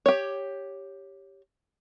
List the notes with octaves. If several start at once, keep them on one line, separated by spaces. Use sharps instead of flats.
G4 C#5